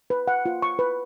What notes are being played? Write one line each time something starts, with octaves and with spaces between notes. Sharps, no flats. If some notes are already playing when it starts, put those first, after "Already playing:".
B4
F#5
F4
C#6
B4